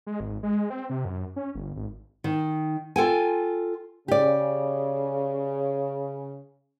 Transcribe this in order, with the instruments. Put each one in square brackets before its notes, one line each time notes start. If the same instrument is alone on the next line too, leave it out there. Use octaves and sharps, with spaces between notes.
[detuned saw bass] G#3
G#1
G#3
C4
C3
F#2
C#4
G1
G#1
[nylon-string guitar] D#3
F4 A4 G5 G#5
[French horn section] C#3 [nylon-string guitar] G4 D5